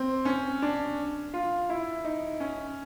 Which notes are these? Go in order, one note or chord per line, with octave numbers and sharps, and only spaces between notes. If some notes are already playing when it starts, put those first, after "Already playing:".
Already playing: C4
C#4
D4
F4
E4
D#4
C#4